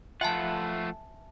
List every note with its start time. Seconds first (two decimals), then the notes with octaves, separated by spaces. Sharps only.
0.21 F3 A3 F4 B4 E5 F#5 G#5 A5